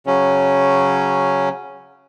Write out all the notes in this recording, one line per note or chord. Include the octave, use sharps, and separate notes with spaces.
C#3 F#3 C#4